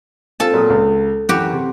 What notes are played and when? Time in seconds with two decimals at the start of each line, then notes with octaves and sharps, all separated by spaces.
0.40 C4 F4 A4 A5
0.54 A#2 F#3 D#6
0.70 C#2
1.29 F#2 E3 F#4 G4
1.53 C3